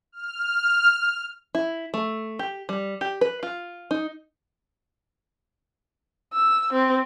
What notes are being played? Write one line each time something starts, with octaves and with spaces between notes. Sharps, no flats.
F6
E4
A3
G4
G3
G4
B4
F4
D#4
E6
C4